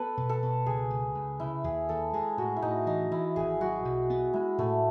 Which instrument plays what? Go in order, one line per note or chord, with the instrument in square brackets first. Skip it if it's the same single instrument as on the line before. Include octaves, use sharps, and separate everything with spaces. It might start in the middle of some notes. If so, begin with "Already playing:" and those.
Already playing: [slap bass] B3 [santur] A4 B4
[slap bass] B2
[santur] A4
[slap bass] B2
[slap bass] C#2 [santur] G#4
[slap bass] C#2
C#2
[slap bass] C#3 [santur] E4
[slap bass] D#2 [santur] G#4
[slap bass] D#2 [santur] A4
[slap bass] G#3 [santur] G#4
[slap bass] A2 [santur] F#4
[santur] E4
[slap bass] A2 [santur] D#4
[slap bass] E3 [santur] D#4
[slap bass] E3 [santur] E4
[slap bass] G#1 [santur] G#4
[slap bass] F#3 [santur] F#4
[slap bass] B1
B3
[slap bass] G#3 [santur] E4
[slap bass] A2 [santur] A3